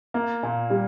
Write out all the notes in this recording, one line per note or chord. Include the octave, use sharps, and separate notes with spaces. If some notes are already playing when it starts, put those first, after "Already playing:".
A#3
A#2
G3